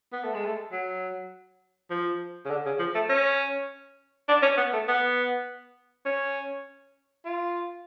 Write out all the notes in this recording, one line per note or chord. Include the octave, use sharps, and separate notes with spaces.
B3
A3
G#3
A3
F#3
F3
C#3
D3
C#3
F3
A3
C#4
D4
C#4
B3
A3
B3
C#4
F4